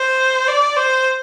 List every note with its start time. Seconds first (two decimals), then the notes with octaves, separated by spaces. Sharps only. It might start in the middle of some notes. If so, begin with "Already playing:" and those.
Already playing: C5
0.48 D5
0.76 C5